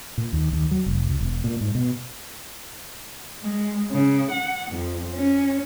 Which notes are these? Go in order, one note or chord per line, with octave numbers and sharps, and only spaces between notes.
A#2
D#2
D#2
F#3
F1
C#2
E1
A#2
G#2
B2
G#3
C#3
F#5
F2
C#4